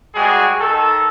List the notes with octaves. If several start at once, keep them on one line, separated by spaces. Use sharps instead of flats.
G3 G#3 C4 F#4 G#4
D#3 A4